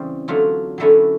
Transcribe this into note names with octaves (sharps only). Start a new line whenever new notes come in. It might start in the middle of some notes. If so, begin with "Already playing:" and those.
Already playing: C#3 E3 G3 C4
D3 F#3 A3 F4
D3 F#3 A3 C#4 E4